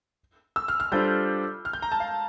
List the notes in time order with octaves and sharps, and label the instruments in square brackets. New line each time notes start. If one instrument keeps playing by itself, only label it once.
[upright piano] E6
F6
F6
[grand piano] G3 D4 F4 A4 C5 [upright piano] G6
[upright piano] F6
G6
A#5
A5
F5